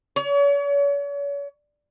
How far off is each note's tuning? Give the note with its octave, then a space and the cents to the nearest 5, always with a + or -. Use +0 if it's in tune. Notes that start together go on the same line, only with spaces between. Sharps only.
C#5 +40